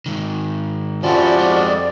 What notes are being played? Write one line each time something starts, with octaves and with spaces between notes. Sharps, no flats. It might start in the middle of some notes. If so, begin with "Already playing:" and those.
G#2 D#3
F2 F3 C#4 E4 F#4 G4 D5
G#3 C4